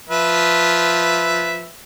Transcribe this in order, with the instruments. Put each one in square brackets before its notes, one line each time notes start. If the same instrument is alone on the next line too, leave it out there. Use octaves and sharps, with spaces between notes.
[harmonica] F3 B4 E5